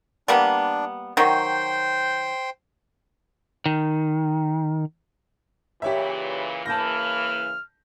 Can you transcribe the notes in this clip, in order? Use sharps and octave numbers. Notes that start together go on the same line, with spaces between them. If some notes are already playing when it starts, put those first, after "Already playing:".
G3 A#3 B3 D4
D#3 F#3 C5 G5
D#3
A#2 C#3 E3 G4 C#5 E5
C#3 E3 A#3 A5 F6 G6 A#6